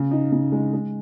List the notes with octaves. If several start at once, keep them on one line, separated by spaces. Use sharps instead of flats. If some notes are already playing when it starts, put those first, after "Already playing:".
Already playing: C#3
D#4
C#3
G#3
G#3